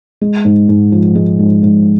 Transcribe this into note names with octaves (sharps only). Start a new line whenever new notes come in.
G#3
G#2
G#2
F3
G#3
G#2
G#2